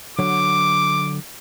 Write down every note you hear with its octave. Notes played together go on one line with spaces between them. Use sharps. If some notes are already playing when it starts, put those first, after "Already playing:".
D3 F#3 C#5 D6